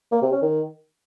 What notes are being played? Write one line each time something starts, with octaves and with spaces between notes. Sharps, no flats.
A#3
C3
C#4
D#3